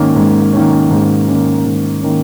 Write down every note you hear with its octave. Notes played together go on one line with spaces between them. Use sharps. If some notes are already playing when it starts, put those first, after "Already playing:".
Already playing: G#2 D#3 A#3 C#4
G#2
D#3 A#3 C#4
G#2
D#3 A#3 C#4
G#2
D#3 A#3 C#4